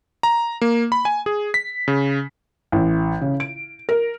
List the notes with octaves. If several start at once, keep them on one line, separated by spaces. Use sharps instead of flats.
A#5
A#3
B5
G#5
G#4
B6
C#3
A1
C#3
D7
A#4